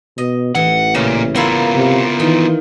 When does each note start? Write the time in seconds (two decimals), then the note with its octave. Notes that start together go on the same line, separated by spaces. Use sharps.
0.18 B2 D#5
0.55 A1 E3 F#5
0.95 A#2 C#3
1.35 A#3 B3 E4 F4
1.75 C3
2.20 D#3 E3